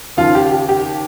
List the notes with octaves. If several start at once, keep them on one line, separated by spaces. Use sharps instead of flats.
D#2 C#3 F3 F4
G4
G4
G4